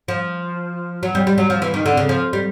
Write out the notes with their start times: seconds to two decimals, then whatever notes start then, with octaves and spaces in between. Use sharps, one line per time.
0.08 F3
1.03 F#3
1.15 G3
1.27 G3
1.38 F#3
1.50 F3
1.62 E3
1.74 D#3
1.86 D3
1.97 C#3
2.09 F3
2.33 G3